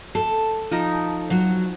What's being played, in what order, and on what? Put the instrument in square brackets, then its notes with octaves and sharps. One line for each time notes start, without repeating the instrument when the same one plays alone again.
[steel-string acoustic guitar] A4
[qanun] F3 D#4
[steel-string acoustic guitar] F#3 F#4